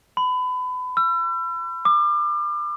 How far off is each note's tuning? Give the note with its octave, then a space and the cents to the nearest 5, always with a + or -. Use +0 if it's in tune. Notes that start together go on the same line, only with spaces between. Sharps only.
B5 +30
E6 +40
D6 +30